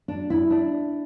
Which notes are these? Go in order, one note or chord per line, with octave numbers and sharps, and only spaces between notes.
D4
E4
D4